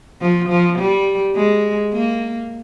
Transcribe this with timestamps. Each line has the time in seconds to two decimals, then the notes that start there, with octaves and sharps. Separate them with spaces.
0.21 F3
0.49 F3
0.78 G3
1.35 G#3
1.92 A#3